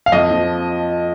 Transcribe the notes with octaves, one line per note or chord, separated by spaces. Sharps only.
F5
F2 D#5
F3